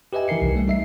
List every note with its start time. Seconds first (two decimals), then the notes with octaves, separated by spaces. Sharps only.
0.13 G4 B4 D#5 E5 G#5
0.28 E3 D#4 A#4 C7 C#7
0.42 C2
0.56 G3 A3
0.68 D#4 E5 C7